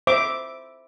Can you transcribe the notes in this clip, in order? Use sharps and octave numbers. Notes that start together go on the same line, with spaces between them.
C5 E5 D6